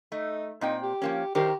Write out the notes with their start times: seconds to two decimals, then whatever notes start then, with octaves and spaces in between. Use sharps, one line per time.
0.12 A3 D#4
0.61 A#2 C4 D#4 G5
0.83 G4
1.02 F3 A#3 C#4
1.35 D#3 G4 A#4 C5